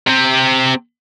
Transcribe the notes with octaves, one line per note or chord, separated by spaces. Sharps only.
C3 C4